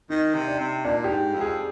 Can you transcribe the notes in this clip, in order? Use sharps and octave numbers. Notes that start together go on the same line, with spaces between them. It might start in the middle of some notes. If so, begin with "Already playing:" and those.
D#3 D#4
C3
D4
C3
A#2 D4
G4
G#2
F2
G#4